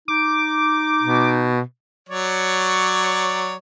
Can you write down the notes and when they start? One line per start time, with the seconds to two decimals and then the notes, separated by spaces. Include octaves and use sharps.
0.08 D#4 D6
1.03 B2
2.09 F#3 C#5 D5